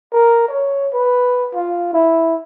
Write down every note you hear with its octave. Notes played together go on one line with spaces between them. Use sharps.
A#4
C#5
B4
F4
E4